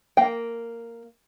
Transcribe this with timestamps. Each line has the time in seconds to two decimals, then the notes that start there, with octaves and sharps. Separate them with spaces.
0.17 A#3 G5